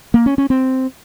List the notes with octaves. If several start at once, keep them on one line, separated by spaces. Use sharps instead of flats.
A#3
C#4
C#4
C4